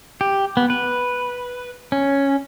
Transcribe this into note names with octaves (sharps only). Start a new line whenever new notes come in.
G4
B3
B4
C#4